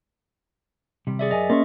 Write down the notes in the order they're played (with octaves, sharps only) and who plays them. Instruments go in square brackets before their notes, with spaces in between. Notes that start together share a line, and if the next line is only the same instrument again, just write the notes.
[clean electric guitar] C3 D#3 G3
[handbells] G#4 D5 E5
[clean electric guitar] F#2 A#4 G#5 [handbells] D#5
[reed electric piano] A#3 C#4 [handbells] D#5 E5 C#6 [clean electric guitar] C6